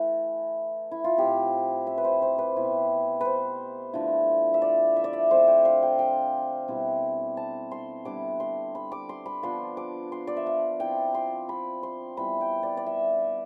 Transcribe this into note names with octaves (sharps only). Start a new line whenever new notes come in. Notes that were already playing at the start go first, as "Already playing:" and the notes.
Already playing: E3 A3 E4
E4
F4
A2 F3 C4 E4 G4
E5
B4
C5
C5
B4
B2 B3 E4
B4 C5
D3 F3 A3 E4
E5
D5
E5
D5
E5
D3 A3 C4 C5
G5
F5
G5
G5
B2 G3 C4 E4
A5
C6
D3 G3 B3 E4 D6
C6
B5
D6
C6
B5
F3 B3 D4 C6
D6
C6
D5
E5
F5
F3 C4 E4 G5
C6
B5
C6
E3 G3 B3 B5
G5
D5
D5
E5